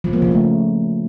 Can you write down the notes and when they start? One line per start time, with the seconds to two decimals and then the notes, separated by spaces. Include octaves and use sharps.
0.04 F3
0.13 A#3
0.22 C#3
0.31 A3